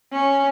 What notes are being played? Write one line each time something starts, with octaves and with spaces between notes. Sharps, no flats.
C#4